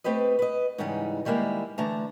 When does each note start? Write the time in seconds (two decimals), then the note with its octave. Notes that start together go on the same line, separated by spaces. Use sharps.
0.04 A3 C4 G4 B4 D#5
0.39 B4 D#5
0.78 G#2 C#3 E3 G3 D#4
1.25 D#3 G3 G#3 A#3 E4
1.78 D3 E3 A3 A5 A#5